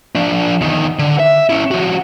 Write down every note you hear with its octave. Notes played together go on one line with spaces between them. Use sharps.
F3 D4
E2 D#3
D3
E5
C#4 E4
F3 F#4